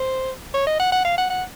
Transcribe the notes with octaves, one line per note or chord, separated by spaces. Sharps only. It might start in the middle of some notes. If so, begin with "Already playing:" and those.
Already playing: C5
C#5
D#5
F#5
F#5
F5
F#5
F#5